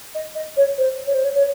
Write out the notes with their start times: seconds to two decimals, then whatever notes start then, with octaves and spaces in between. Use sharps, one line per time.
0.15 D#5
0.35 D#5
0.56 C#5
0.78 C5
1.06 C#5
1.14 C5
1.23 C#5
1.34 C#5